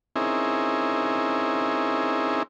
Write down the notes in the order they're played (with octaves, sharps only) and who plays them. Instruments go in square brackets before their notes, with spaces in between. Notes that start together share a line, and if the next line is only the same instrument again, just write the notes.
[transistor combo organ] C4 C#4 D#4 E4 G#4 A#4